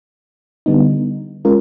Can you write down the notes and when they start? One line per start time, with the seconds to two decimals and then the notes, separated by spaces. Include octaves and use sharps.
0.66 D3 G3 B3 D#4
1.45 G#3 C#4 F4 A#4